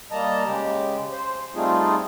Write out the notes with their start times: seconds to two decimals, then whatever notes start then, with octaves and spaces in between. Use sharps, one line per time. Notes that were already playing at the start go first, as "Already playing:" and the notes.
0.12 G3 A#3 D#5 A5 A#5
0.46 C#3 G#3 G4
1.11 C5
1.55 G3 A3 C4 D#4 F4 G#4